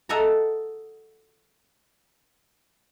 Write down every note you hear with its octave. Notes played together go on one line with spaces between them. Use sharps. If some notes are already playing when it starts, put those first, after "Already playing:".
A4 D#5 E5 F#5 G#5 A#5